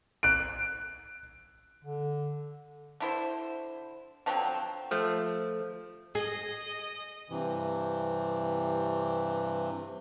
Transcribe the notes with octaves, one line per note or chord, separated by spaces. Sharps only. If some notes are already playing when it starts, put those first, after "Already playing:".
F#6 D7
D3
D3 E4 C5
D3 F3 F#3 C4
F3 A3
G#4 D#5
G2 C3 E3